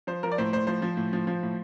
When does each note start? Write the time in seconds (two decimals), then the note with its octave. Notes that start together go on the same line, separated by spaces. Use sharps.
0.07 F3 C5
0.23 F3 A#4
0.32 D5
0.38 A2 C5
0.53 A2 C5
0.67 F3 C5
0.82 F3
0.97 A2
1.13 F3
1.27 F3
1.43 A2